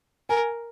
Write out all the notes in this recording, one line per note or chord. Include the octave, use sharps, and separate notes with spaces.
A#4 G#5